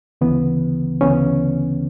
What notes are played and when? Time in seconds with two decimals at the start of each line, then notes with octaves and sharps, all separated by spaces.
0.21 D2 C#3 E3 B3
1.01 D2 C#3 E3 B3 C#4